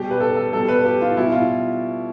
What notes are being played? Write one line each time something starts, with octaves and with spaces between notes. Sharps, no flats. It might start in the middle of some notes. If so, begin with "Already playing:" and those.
Already playing: B2 G3 G4
B4
A4
A4
B2 G3 A4
B4
G4
F4
B2 G3 E4
F4